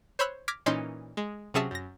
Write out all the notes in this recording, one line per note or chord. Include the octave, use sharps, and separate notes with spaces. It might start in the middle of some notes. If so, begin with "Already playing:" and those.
C5 C#5 B5 E6 F#6
D6 F6 G#6 A#6 B6
A#2 E3 C#4 D#4 C6 D#7
G#3
C3 F#3 C#4 G#4 E5 A5
F#2 A#6